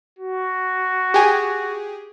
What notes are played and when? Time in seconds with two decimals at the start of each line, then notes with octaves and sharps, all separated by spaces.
0.19 F#4
1.14 G4 G#4